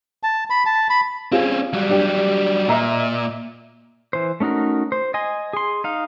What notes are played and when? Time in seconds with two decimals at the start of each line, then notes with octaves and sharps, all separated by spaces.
0.23 A5
0.50 B5
0.66 A5
0.90 B5
1.32 C4 C#4 F4 G#4
1.73 F#3 G3
1.89 D4 G4
2.69 A#2 D#5 E5 A#5
4.13 E3 C5
4.40 A3 C#4 D#4 F#4 A#4
4.92 C5
5.14 D#5 G#5 C6
5.53 G#4 C6
5.84 D#4 F5